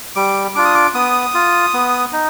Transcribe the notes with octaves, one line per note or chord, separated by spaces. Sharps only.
G3 D6
D4 F4 D6
D#6
D6
B3 D#6
F4
B3
D#4